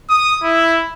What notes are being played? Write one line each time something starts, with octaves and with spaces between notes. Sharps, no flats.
D#6
E4